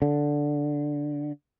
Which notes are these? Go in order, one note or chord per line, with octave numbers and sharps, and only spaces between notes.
D3